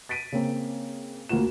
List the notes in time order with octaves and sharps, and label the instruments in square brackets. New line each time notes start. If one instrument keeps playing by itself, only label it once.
[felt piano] A6 B6 D7 D#7
C#3 A#3 C4
D2 A#3 F4 F#4 E7